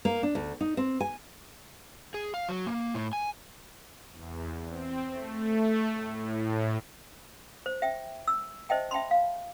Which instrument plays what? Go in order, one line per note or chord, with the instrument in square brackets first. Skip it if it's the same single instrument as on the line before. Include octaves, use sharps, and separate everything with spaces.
[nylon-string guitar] A#3
D4
D2
D#4
C4
G#5
[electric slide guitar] G#4
F5
F#3
A#3
A2
G#5
[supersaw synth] E2
C4
A3
A2
[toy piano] C5
E5 G5
E6
C5 D#5 E5 G5 A5
E5 G5 A5 B5 C6
F5